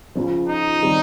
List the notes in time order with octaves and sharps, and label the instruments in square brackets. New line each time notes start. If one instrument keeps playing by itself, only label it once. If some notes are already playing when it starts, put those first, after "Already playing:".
[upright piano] C#2 C#3 F3
[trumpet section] D#4
[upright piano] D#3 G3 C4